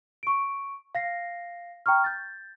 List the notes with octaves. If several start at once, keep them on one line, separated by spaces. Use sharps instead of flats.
C#6 D7
F5 A#6 C7
G5 A#5 C#6 F6
G6 A6